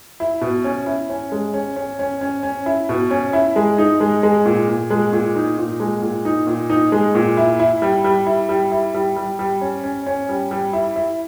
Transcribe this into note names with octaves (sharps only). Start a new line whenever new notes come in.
E4
B2
C#4
E4
C#4
G#3
C#4
C#4
C#4
C#4
C#4
E4
B2
C#4
E4
G#3
D#4
G#3
G#3
A#2
A#2
G#3
A#2
D#4
A#2
G#3
A#2
D#4
A#2
D#4
G#3
A#2
E4
E4
G3
G3
E4
G3
E4
G3
G3
G3
C#4
C#4
C#4
G3
G3
E4
E4